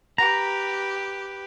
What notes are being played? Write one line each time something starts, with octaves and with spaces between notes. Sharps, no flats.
G4 B4 A#5